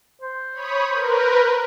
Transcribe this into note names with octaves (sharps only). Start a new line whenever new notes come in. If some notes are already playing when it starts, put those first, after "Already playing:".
C5
C#5 B5 D#6
A#4 B4